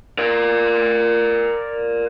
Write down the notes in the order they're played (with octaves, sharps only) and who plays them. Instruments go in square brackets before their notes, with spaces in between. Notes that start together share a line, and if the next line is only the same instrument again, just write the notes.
[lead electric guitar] A#4 D5